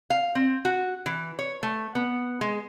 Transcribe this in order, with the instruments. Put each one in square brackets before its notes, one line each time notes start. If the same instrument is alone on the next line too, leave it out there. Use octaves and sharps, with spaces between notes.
[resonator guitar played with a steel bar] F5
C4
F#4
E3
C#5
A3
B3
G#3